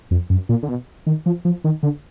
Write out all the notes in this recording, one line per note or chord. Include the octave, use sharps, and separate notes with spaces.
F2
F#2
A#2
D3
B2
D#3
F3
F3
D#3
D3